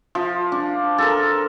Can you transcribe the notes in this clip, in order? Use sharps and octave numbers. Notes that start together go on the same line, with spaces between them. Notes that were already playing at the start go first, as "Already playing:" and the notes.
F3
D4
A4 A#4